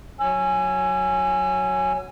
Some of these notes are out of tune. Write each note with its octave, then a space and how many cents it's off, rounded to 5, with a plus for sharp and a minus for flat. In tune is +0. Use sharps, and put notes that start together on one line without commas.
F#3 +0 G#5 +0 E6 +40